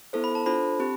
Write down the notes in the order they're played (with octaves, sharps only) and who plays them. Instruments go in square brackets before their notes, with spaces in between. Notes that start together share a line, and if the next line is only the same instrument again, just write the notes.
[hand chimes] B3 E4 A4 C5
[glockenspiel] B5
A5
[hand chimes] D4 F4 A4 C5 [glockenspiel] B5
[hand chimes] C4 G4